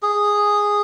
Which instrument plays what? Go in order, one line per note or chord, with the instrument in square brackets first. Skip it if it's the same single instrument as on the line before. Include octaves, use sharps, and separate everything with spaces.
[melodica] G#4